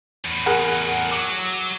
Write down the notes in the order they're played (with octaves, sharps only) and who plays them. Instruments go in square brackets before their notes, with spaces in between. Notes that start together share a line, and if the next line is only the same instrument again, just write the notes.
[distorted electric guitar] E2 A2
[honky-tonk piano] G#4 A#4 F#5
[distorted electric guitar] F#3 [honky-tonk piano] D6